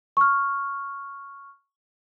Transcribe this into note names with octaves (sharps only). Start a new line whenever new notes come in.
C#6 F6